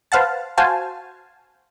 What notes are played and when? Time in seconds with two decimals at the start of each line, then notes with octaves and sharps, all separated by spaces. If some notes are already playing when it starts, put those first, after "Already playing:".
0.12 B4 C5 F5 F#5 A5
0.58 F#4 C5 F5 G#5 A5